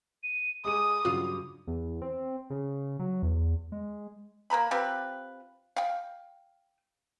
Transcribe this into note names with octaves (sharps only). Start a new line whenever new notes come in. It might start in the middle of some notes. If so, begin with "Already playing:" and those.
D#7
G#3 G#4 D6 D#6 D#7
G2 C#3 F#3 F4
E2
C4
C#3
F#3
E2
G#3
A#3 B4 A#5 B5
C4 F4 G4 B4
F5 G5